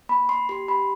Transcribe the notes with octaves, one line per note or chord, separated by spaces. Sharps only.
A#3 B5
A#3 C6
G4 C6
G4 B5